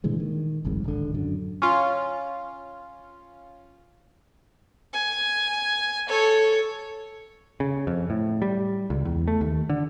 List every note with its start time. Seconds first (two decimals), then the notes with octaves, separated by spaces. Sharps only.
0.04 A#2 D3 E3 G#3
0.20 D#3
0.65 F#1 C2 F2 G#2
0.84 D1 G#1 D3
1.14 F#2 D3
1.62 C#4 F4
4.93 G#5
6.08 A4 C#5
7.60 C#3
7.87 F2
8.10 A2
8.42 G3
8.90 C#2
9.05 E2
9.28 A3
9.41 D#2
9.69 D3